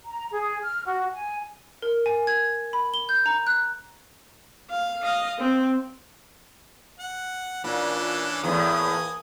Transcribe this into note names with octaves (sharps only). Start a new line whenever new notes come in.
A#5
G#4
F6
F#4
G#5
A#4
G#5
G#6
B5
G7
G6
A#5
F#6
F5
D#5 F5
C4
F#5
A#2 E3 C#4 D4
E2 A2 A#3 G#5 D#6